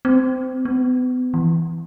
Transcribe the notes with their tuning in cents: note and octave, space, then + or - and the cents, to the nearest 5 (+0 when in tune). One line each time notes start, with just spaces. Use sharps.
C4 -20
B3 +35
E3 +5